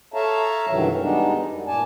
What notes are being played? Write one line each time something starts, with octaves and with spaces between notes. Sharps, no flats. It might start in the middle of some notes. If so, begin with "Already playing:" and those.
A4 C#5 E5 F5 A5 A#5
G2 C3 D#3 E3 F#3
G3 G#3 B3 D4 D#4
F#2
A#2 D5 G#5 A5